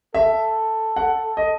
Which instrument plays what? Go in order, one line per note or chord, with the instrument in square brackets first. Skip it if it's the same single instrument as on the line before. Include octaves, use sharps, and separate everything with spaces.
[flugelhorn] A4 [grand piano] E5
[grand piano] F#5
D#5